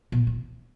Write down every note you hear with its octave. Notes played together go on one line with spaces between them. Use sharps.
B2
C3